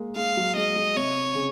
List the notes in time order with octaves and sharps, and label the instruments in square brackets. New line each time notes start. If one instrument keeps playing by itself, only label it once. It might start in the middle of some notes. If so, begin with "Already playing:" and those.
Already playing: [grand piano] G#3 A#3
[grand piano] G#3 [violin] F5
[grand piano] F#3
[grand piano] G#3 [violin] D#5
[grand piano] G#3
[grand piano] C3 [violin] C#5
[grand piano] C#3